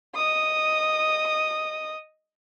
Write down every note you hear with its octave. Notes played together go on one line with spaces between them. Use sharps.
D#5 D#6